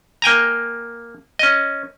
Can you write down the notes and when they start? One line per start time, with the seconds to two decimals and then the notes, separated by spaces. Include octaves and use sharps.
0.22 A#3 G5 G#5 A#5
1.39 C#4 D#5